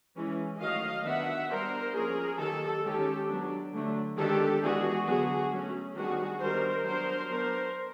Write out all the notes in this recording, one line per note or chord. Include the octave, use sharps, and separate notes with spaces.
E3 G#3 C#4
D#3 F#3 A3 D#5 F5
D#3 F#3 B3 D4 E5 F#5
G3 B3 D4 A#4 C5
F3 A#3 C#4 G#4 A#4
D#3 F#3 A#3 G4 A4
D#3 G#3 C#4 G4 A4
F#3 B3 D4
D3 F#3 A3 D4
D#3 G#3 B3 D4 G4 A4
E3 G#3 B3 D4 F#4 G#4
D3 F#3 B3 F#4 G#4
F#3 A3 C#4
D#3 G3 B3 D4 F#4 G#4
D#3 G3 B3 D4 A#4 C5
F#3 B3 D4 A#4 C5
F#3 B3 D4 A#4 C5